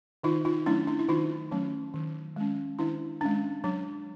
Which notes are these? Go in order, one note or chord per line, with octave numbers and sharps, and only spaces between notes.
D#3 D#4 F4
D#4 F4
F#3 A3 C#4 D4 E4
D4 E4
E4
D#3 D#4 F4
F#3 A3 C#4
D#3
G#3 C#4
D#3 D4 E4
G#3 C#4 D4
F#3 D4